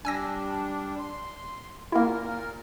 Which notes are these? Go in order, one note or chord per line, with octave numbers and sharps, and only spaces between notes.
G3 D4 G#5 E6 A#6
C6
A#2 A#3 E4 A#4